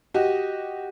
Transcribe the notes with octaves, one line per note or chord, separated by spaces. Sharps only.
F#4 G4 D#5